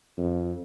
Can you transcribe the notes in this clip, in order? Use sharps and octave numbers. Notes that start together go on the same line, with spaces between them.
F2